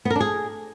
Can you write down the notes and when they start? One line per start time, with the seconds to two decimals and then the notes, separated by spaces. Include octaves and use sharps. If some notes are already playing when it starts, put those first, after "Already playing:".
0.05 B3
0.10 A#4
0.15 D4
0.20 G#4